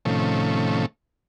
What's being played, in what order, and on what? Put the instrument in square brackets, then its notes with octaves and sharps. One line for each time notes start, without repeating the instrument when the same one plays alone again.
[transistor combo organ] A2 C3 D#3 F3 A3 C#4